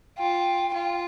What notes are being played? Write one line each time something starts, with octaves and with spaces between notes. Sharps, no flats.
F4 G5
F4